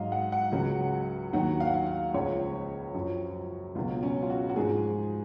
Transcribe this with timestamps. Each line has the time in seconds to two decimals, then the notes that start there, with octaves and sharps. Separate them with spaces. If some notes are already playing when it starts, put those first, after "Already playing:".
Already playing: G#2 F#3 D#5 F5
0.12 F#5
0.32 F#5
0.52 C#2 C#3 F#3
1.33 D#2 D#3 F#3 F#5
1.60 F5
1.67 F#5
1.74 F5
1.86 F5
2.14 C#2 C#3 F3 C#5
2.94 F#2 F3
3.75 C#2 B2 F#3 F4
4.03 C#4
4.23 F4
4.30 F#4
4.50 F#4
4.56 G#2 F3 G#4